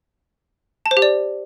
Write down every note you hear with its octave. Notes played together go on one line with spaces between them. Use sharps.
A5
C5
G4
D5